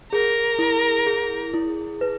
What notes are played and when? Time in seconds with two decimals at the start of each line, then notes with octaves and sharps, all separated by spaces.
0.12 G#4 A#4
0.59 E4
1.07 G#4
1.54 E4
2.01 B4